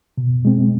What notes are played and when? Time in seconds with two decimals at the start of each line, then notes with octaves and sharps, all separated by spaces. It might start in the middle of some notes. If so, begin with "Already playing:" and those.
0.18 B2
0.45 G#3 C4